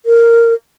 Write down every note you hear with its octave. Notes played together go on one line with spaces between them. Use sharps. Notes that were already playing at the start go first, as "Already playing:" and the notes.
A#4